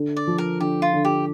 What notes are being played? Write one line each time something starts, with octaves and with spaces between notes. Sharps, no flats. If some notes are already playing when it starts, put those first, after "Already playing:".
Already playing: D3
D5
F3
A#4
D3 G4
F4
D3
G4